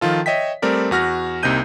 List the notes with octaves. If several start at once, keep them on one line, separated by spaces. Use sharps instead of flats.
D#3 F3 F4 A4
C#5 D#5 E5 G5 B6
G3 A3 C4 A#4 D5
E2 F#4 F6 A#6
C2 C3 A#3 D#4 G6 D#7